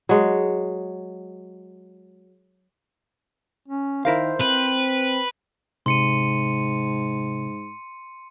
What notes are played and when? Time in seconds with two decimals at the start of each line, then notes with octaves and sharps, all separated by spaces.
0.09 F#3 G#3
3.68 C#4
4.05 D#3 E4 A#4 C5 F5
4.41 C4 B4
5.86 G#2 C3 C6 C#7 D#7